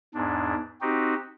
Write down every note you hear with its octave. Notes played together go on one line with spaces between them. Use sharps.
E2 G#2 D4
C4 D#4 F#4 G4